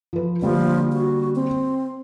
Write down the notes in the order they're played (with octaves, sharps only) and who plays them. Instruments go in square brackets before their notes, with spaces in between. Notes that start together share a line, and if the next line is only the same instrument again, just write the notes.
[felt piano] F3 B4
[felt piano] D3 G3 A#3 [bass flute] F3
[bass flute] F#4
C4